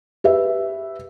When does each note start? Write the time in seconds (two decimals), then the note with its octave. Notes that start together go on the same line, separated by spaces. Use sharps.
0.24 G4 B4 E5